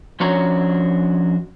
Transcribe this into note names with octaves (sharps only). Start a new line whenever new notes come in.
F3 C#4 D4 F#4 C#5 A#5